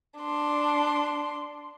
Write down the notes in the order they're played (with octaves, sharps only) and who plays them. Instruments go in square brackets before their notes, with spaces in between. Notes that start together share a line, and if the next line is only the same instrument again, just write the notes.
[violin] D4 C6